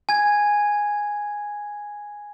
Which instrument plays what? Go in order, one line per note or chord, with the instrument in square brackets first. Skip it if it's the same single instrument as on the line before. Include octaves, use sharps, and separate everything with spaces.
[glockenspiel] G#5 G#6